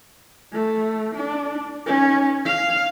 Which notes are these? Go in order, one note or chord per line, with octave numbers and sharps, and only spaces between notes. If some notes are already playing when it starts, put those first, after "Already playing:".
A3
D4
C#4 D#4
F5